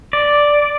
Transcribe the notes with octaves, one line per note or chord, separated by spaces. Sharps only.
D5